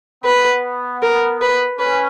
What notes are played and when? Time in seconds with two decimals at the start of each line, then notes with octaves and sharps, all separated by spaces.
0.24 B3 B4
1.02 A#4
1.41 B4
1.79 C#4 B4